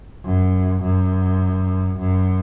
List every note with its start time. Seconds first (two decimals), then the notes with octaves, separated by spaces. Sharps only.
0.25 F#2
0.82 F#2
1.99 F#2